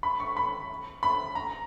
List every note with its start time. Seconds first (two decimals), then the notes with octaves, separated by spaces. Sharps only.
0.03 B5
0.20 C#6
0.37 B5
1.03 B5
1.35 A#5